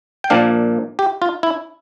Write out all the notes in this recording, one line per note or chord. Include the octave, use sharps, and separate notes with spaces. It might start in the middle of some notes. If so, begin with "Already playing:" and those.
G5
A#2 F3 A#3 D4 F5
G4
F4
E4